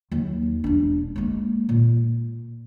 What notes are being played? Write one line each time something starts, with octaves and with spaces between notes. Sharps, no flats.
D#2 F#3
E1 D4
G#3 A#3
A#2